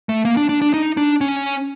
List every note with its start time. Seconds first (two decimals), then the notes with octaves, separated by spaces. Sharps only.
0.09 A3
0.25 A#3
0.37 D4
0.49 D4
0.61 D4
0.74 D#4
0.97 D4
1.21 C#4